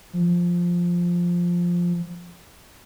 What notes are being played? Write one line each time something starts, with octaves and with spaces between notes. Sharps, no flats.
F3